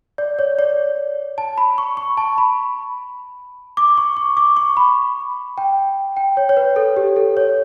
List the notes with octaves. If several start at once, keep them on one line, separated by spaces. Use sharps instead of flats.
D5
C#5
D5
A5
B5
C#6
C#6
A5
B5
D6
C#6
C#6
D6
C#6
B5
G5
G5
C#5
C#5
B4
A4
G4
A4
C#5